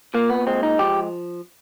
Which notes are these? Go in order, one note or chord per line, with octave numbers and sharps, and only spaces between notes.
A#2 A#3
B3
G#3 C4
D#4
F3 G4